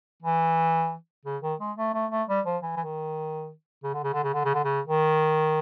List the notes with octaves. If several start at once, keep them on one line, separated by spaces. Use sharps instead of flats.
E3
C#3
D#3
G#3
A3
A3
A3
G3
F3
E3
E3
D#3
C#3
D3
C#3
D3
C#3
D3
C#3
D3
C#3
D#3